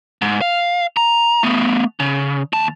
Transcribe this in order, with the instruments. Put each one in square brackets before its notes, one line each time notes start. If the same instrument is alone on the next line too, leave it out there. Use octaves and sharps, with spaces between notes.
[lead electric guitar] G#2
F5
A#5
A3 B3
C#3
D#2 A5